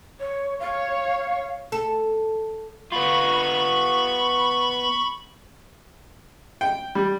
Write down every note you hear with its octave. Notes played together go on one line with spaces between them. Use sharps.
C#5
C#5 F5
A4
B3 F4 B5 C#6
G5
G3